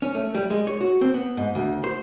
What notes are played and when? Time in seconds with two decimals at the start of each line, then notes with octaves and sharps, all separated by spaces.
0.02 C#4
0.15 A3
0.34 G3
0.50 G#3
0.67 C#5
0.81 F#4
1.01 C4
1.14 B3
1.37 G#2
1.55 D2
1.84 C5